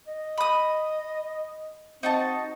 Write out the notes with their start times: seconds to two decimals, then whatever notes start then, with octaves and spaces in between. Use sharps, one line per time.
0.07 D#5
0.38 B5 D#6
2.03 C4 D#4 F#4 A5